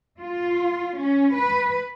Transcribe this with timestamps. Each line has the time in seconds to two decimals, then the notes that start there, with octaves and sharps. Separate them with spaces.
0.19 F4
0.95 C#4
1.33 B4